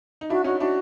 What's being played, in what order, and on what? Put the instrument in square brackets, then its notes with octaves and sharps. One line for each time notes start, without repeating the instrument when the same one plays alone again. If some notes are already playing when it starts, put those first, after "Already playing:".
[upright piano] D#4
[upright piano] D4 E4 [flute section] F#4
[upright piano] C#4 D#4 [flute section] F#4
[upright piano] D4 E4 [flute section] F#4